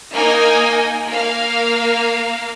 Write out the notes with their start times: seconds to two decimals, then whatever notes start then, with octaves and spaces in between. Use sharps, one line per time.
0.13 A#3 D#4 G#5
1.08 A#3 F5